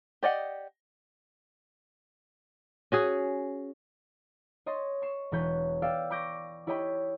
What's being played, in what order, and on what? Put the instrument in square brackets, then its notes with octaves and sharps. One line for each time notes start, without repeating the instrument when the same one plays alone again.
[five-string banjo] G4 D5 D#5 F#5
[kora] C#4 F#4 G#4
[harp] C#5 D#5 C6 A6
C#6 C7 E7
E1 E3 B4 C#5 G6
D5 F5 G5 E6 A6 C#7
B5 C#6 D6 G6 A#6
E4 G4 C#5 D#5 G5 B5